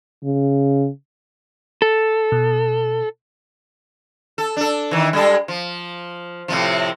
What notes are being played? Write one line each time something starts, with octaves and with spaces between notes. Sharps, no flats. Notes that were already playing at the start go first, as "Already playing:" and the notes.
C#3
A4
B2
A4
D4 A4
D#3 E3
G3 G#3 A4
F3
A2 C3 F3